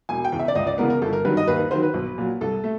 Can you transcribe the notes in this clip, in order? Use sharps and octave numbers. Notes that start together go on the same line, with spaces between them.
E1 G#5
G5
E2 C#3
E5
D5
C#2 D#5
D5
C#3 E3 G#3 B3 A#4
A#4
G1 A4
A#4
G2 D#3 F#3 B4
D#5
D#2 B4
B4
D#3 F#3 C5
B4
B1
A#2 F#3
C2 A4
A3